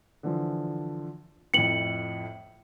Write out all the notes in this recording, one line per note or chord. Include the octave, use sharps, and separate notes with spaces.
D3 E3 F3
F2 A2 C#7 F#7